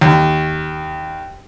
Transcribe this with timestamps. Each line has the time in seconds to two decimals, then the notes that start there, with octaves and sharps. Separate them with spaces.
0.01 D#2